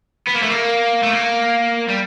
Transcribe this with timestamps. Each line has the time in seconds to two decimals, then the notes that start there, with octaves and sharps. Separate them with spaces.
0.28 B3
0.35 A#3
0.43 A3
0.50 A#3
1.03 A3
1.13 A#3
1.88 G3